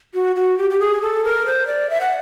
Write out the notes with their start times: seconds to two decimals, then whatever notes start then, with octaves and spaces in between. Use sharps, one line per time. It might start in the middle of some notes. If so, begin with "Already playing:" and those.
0.14 F#4
0.36 F#4
0.58 G4
0.70 G4
0.80 G#4
1.02 A4
1.24 A#4
1.46 C5
1.67 D5
1.90 E5
2.01 F#5